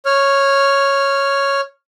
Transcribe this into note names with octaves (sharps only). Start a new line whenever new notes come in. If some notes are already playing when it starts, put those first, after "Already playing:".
C#5 F6